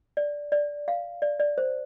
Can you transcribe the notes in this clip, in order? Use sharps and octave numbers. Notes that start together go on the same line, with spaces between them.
D5
D5
F5
D5
D5
C5